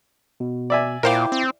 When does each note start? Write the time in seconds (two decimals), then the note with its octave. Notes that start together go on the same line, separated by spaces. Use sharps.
0.40 B2
0.70 D5 E5 G#5
1.03 A#2 E4 A#4 C5 F5 G5 D6
1.32 C4